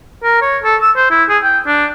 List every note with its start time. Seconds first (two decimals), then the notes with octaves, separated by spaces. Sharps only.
0.23 A#4
0.42 C#5
0.64 A4
0.81 E6
0.96 C5
1.11 E4
1.29 G#4
1.44 G5
1.67 D4